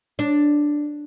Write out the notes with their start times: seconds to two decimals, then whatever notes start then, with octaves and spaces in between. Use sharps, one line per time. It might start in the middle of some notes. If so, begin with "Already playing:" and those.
0.19 D4